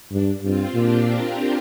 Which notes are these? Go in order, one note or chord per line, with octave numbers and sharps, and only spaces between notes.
G2 D4
G2 C4 F4
A#2 D4 G4
F4 A#4